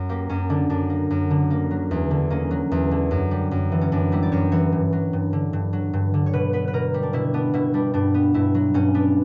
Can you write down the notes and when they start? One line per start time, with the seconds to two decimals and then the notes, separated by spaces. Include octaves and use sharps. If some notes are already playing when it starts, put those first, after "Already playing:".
Already playing: F#2
0.09 A#3 G4
0.29 F#2 C#4
0.50 D3 D4
0.70 F#2 D4
0.90 A#3
1.10 F#2
1.30 D3
1.50 A#3
1.71 F#3
1.91 E2
2.11 D3
2.30 A#3 C#4
2.51 F#3
2.71 E2
2.91 D3
3.11 F#2
3.31 G3
3.51 F#2
3.72 E3
3.81 C#4
3.92 F#2 D4
4.12 G3 E4
4.23 D5
4.32 F#2 C#5
4.52 E3 C#5
4.72 G2
4.93 F#3
5.13 G2
5.33 D3
5.53 G2
5.73 F#3
5.93 G2
6.14 D3
6.26 C#5
6.33 B2 B4
6.53 B3 B4
6.68 B4
6.73 B2 A#4
6.94 G3
7.03 D4
7.13 B2 E4
7.34 B3 D4
7.54 B2 E4
7.74 G3 D4
7.94 G2 D4
8.14 B3
8.34 G2 E4
8.55 F#3
8.74 G2 C#4
8.94 B3 D4